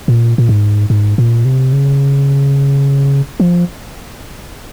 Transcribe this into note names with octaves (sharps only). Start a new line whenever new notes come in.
A#2
A#2
G#2
G#2
A#2
C3
C#3
F3